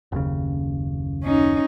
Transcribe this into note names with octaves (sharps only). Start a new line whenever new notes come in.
F#1 D#2 C#3
C#4 D#4